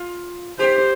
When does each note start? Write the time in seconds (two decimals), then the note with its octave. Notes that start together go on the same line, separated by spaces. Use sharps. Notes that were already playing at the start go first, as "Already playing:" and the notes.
Already playing: F4
0.59 G4 C5